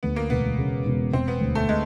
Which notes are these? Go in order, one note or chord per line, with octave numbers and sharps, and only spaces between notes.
D2 B3
A#3
E1 B3
C#3
E1
E1 C4
B3
D2
A3
G#3